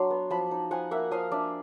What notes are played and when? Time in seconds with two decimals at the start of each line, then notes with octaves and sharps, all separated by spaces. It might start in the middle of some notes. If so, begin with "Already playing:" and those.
Already playing: F#3 D4 C6 D6
0.11 B3
0.30 F3 A5 B5
0.51 D#4
0.71 F3 F#5 G#5
0.91 A#3 E5 F#5
1.11 F3 D#5 F5
1.32 D4 D5 E5